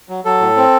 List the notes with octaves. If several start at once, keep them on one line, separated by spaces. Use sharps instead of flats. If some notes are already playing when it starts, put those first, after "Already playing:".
F#3
F#3 A4
A2
C4